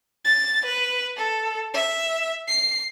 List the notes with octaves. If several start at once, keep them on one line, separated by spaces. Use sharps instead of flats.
A6
B4
A4
E5
C7